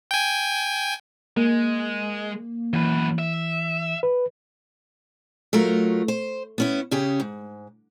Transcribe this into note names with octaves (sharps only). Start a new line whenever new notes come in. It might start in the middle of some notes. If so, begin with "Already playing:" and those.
G5 G#5
G#3 A#3
F#2 E3 B4
E5
B4
F#3 A3 F4 A#4
C5
B3 C#4 E4
C#3 C#4 G4 G#4
G#2